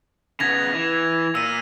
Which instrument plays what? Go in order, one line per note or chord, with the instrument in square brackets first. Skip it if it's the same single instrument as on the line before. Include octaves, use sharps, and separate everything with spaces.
[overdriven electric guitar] C#3 B3 [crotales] G#6 A#6 F7
[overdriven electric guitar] E3
[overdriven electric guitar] A#2 [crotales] E6 D#7